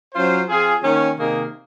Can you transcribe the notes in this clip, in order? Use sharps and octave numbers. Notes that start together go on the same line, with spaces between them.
F#3 C#4 F4 C5
F3 C4 F4 G#4
D#3 A#3 C#4
C3 D#3 A#3 D#4 G#4